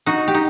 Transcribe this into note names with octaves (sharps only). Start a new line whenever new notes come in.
D#4 F#4
G4
D#4